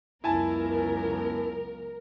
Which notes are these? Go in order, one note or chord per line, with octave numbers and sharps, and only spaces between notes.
C#2 F#2 B3 E4 A#4 G#5 A5